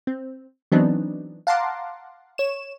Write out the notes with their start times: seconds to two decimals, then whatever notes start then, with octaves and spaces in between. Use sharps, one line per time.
0.07 C4
0.72 E3 F#3 B3 C4 D4 D#4
1.47 F5 F#5 A5 A#5 C6 D6
2.38 C#5 E7